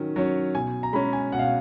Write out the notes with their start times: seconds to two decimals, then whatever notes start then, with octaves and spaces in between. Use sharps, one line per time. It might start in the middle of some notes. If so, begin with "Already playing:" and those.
Already playing: D#3 F#3 C#4
0.16 F#3 C#4
0.55 B2 G#5
0.83 A#5
0.93 G#3 C#4 B5
1.13 G#5
1.32 B2 F#5
1.39 F5